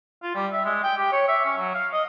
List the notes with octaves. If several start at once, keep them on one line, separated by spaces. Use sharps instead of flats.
F4
G3
E5
G#3
G5
G4
C#5
E5
C#4
F#3
F5
D#5